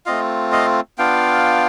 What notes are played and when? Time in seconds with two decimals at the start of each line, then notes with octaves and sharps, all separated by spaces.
0.06 A3 C4 F4 D#5 F5
0.52 D#5 F5
0.98 B3 D4 F4 F5 G5